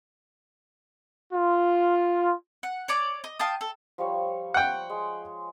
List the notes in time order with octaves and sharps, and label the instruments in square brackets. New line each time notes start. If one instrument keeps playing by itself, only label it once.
[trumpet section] F4
[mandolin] F#5
C#5 D5 D6
D#5
F5 G5 A5 D#6
A4
[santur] F3 G3 C#5
[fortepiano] F#5 G5
[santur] G#3